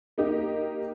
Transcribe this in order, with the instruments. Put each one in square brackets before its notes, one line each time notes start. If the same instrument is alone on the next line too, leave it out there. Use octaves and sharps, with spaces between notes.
[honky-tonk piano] A#3 D#4 G4